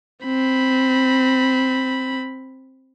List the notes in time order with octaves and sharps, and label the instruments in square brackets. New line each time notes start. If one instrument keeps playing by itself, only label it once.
[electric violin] C4 B5